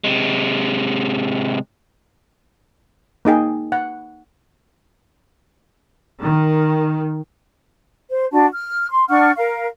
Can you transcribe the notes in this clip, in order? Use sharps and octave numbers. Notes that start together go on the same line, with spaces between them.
C3 G#3
A#3 D#4 G#4 G5
F#5
D#3
C5
D4 F#4 A5
F6
C6
D4 F#5 C#6 F6
A#4 F5